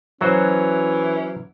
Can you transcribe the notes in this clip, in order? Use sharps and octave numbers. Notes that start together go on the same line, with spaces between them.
E3 F#3 C#4 F#4 C5